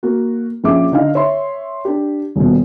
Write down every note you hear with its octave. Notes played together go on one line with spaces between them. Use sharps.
A#3 F#4
A#1 C#4 G#4 E5 D6
D3 D#4 F5
C#5 E5 C6
D4 G4
D#1 B2